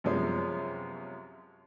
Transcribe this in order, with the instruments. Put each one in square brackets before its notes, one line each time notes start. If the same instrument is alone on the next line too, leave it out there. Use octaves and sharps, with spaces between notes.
[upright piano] F#2 C3 F3 G#3 B3 C#4